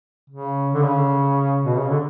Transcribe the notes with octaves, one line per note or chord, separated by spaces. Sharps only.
C#3
D3
C#3
B2
C#3
D3